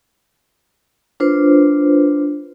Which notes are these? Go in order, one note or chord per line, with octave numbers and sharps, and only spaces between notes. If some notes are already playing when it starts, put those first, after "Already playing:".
D4 F4 B4 C5